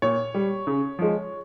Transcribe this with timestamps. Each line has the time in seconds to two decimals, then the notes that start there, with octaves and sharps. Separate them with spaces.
0.02 A#2 C#5
0.34 G3
0.67 C#3
0.99 F3 G#3